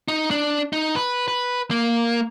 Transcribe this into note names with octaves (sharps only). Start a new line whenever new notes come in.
D#4
D4
D#4
B4
B4
A#3